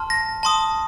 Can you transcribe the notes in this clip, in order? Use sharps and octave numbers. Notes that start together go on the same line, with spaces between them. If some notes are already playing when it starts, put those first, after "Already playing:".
Already playing: A5 C6 F6
A#6
A5 C6 D#6